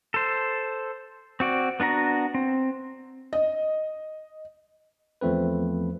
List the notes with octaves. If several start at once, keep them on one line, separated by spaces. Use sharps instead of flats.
A4 C5
C4 F#4 D5
B3 D4 F#4 A#5
C4
D#5
E2 F3 A3 C4 B4